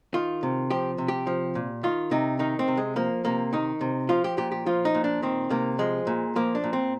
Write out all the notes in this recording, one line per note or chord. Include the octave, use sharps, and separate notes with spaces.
D#3 F4
C3
F3 G4
C3
G4
F3
A#2
D#3 F4
C3 D#4
D#3 D#4
C4
C3
G#3
F3 A#3
C3 A#3
D#3 D#4
C3
F3 F4
G4
A#2 G4
G4
F3 F4
D#4
A#2
D4
D#3 C4
C3 A#3
F3 G#3
A#2
F3 A#3
D4
A#2
C4